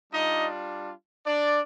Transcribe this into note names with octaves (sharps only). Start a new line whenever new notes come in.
G3 D4 D#4 F4 D#5
D4 D5